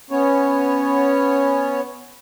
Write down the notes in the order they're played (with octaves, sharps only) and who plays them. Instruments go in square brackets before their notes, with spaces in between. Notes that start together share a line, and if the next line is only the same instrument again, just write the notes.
[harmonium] B3 C#4 C#5